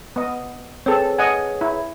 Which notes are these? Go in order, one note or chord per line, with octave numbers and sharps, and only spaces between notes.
B3 D#5
C4 G#4 A4 B4 C#5
D#5 F#5 G#5
E4